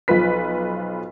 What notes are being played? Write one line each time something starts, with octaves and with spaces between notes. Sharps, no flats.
B1 F3 F4 B4 B6